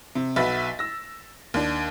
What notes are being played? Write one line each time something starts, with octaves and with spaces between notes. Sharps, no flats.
C3
B1 F#4 B4 E5 A6 B6
E6 A#6
D#2 D4